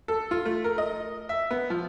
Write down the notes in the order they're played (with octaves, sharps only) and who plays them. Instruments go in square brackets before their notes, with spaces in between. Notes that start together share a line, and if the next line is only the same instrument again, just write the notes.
[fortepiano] A4
F4
A3
A#4
D#5
E5
B3
F3